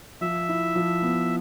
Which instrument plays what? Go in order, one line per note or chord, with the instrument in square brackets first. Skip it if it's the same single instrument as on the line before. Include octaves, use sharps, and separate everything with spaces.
[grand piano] F3 [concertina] E5
[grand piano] E4
F3
B3